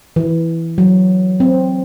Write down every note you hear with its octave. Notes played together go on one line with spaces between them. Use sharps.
E3
F#3
C4